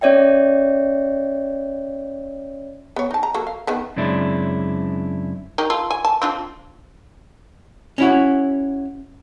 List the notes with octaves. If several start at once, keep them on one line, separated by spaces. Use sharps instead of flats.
C#4 C#5 D5 E5 G5
B3 C#5
D#4 A5
A#5
F#3 A#3 A4
F5
D#3 B3 B4
F#2 C#3 G#3 C4 D4 E4
D#3 D#4 G4
F4 A4
G#5
A5
C4 D4 F4
C#4 E4 F#4